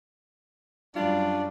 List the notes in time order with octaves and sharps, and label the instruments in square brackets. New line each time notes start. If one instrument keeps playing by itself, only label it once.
[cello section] F#2 G3 [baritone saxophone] D4 [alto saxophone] F4 [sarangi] D5